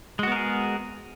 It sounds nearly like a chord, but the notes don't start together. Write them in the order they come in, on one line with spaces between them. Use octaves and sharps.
G#3 F#4 B3 A#4 G#4